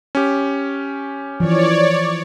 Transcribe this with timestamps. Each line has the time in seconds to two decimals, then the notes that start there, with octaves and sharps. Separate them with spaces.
0.15 C#4 G4
1.40 E3 F3 C#5 D5